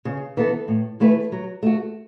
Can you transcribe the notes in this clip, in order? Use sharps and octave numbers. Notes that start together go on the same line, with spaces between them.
C#3
E3 B3 A4
A2
E3 A3 E4 B4
F#3
A3 F#4